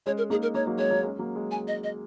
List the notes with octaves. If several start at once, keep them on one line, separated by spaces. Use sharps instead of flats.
G#3 C#4 C#5
A#4
A#3 D#4 G#4
A#4
A#3 D#4 C#5
F#3 A#3
G#3 C#5
F#3 A#3
G#3 C#4
F#3 A#3
G#3
G#5
D#5
D#5